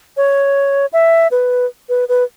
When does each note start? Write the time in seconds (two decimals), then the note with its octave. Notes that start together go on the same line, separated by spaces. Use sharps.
0.17 C#5
0.93 E5
1.31 B4
1.89 B4
2.09 B4